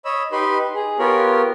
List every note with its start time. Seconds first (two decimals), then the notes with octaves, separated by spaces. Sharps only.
0.05 C#5 D#5 B5 E6
0.32 D#4 G4 B4 B5 C6
0.75 G#4
0.99 B3 F4 G4 A#4 C#5